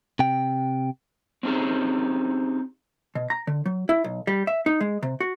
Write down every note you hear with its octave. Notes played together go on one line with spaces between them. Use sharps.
C3 G5
C4 C#4 D#4 G4 G#4
B2
A#5
D3
F#3
E4
B1
G3
E5
D#4
G#3
C3
F#4